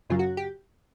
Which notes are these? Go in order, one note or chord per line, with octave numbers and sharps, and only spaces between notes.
F#2 C#3 F#3 F4
F#4
G4